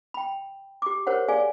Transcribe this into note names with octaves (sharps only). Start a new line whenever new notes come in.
G5 B5
G4 D6
G4 A#4 C5 C#5 F#5
G#4 D5 F5 G#5